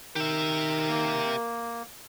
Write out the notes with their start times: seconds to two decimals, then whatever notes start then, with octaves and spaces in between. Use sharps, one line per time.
0.16 D#3 G4 A#4 E5
0.89 A#3